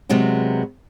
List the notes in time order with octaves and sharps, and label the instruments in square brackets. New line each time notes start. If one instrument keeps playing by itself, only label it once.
[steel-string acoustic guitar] C3 F#3 G#3 B3